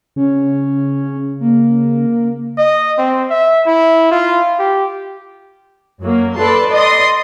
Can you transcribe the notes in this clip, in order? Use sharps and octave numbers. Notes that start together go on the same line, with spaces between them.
C#3 C#4
A#3
D#5
C4
E5
E4
F4
G4
F#2 F#3 A#3
A4 B4 D5 A5 C6
D5 D#5 C6 D#6